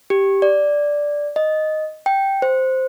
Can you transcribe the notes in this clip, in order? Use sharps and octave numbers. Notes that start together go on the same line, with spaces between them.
G4
D5
D#5
G5
C5